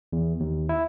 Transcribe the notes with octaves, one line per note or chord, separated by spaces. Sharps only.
E2
D#2
E4